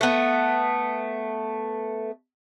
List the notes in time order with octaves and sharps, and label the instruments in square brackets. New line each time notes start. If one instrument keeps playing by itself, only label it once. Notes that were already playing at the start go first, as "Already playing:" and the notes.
[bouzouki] A3 B3